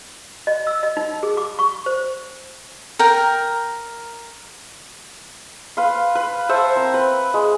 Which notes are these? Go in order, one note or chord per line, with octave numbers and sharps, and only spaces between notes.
D#5
E6
D#5
D#4
G#4
D6
C#6
C5
A#4 G5
B4 F5 C6
B4
C5 E5 F#5 A5
C4 A#4
B4
G#3